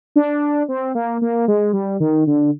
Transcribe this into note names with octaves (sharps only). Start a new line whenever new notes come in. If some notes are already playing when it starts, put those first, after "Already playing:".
D4
C4
A#3
A#3
G#3
G3
D#3
D3